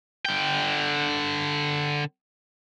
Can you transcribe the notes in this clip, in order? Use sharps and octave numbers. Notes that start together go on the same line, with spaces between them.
D3 G5